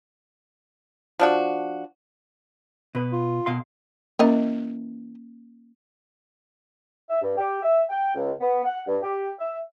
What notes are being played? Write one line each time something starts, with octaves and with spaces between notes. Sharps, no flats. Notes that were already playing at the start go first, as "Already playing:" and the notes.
F3 D4 F#4
B2 B4
F4
B2 F5 C6
E3 A#3 C#4 A#4 D#5
E5
G2
G4
E5
G5
C#2
B3
F#5
G2
G4
E5